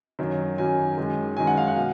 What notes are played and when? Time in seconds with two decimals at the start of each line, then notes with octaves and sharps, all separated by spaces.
0.19 F#2 D#3 F#3
0.58 F#2 D#3 F#3 G#5
0.98 F#2 D#3 G#3
1.37 F#2 D#3 G#3 G#5
1.47 F#5
1.57 F5
1.68 F#5
1.76 B2